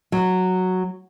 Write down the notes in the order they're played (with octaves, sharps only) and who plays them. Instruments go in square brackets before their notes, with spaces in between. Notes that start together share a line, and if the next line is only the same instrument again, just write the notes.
[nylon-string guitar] F#3